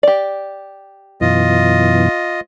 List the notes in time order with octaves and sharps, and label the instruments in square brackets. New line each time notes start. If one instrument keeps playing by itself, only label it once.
[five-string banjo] G4 D5
[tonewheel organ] F#2 B2 E3 [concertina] F4 D#5